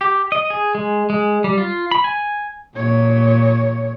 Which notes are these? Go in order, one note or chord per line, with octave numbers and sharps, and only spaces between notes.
G4
D#5
G#4
G#3
G#3
G3
F4
B5
G#5
A#2 C#5